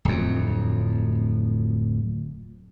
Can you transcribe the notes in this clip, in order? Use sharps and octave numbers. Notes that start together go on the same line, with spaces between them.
D1 F2